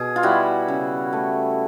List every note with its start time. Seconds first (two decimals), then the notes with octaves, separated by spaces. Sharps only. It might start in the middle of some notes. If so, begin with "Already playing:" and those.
Already playing: B2 G#4
0.16 F4
0.23 G3 E4 F#4
0.68 C#3
1.13 A3